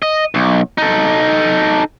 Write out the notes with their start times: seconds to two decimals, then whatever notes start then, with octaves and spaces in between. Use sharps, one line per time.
0.02 D#5
0.35 B1
0.78 D#4 A4